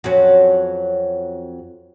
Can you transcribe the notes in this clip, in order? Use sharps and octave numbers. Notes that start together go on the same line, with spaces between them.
F2 F#3 C#4